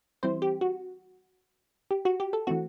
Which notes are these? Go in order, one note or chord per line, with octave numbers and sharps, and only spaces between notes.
E3 G3 C4 E4 C5
G4
F#4
G4
F#4
G4
A4
E3 A3 C4 F#4